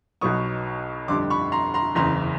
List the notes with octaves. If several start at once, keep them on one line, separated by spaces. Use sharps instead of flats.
B1 B2 F#3 B3 C#6 D#6
G1 F2 D3 G3 C6 D6
B5 C#6
A#5 C6
A#5 C6
F#1 E2 C#3 A#5 C6